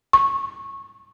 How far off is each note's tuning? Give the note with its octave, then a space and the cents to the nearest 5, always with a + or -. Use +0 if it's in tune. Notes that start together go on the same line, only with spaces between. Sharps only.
C#6 -15